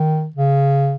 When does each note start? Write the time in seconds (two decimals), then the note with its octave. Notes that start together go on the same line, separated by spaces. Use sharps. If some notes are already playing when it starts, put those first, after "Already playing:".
Already playing: D#3
0.36 C#3